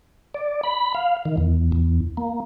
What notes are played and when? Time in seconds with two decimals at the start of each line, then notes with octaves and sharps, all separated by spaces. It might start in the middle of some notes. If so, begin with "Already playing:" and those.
0.34 D5
0.64 B5
0.95 F5
1.25 D#3
1.37 E2
1.72 E2
2.17 A#3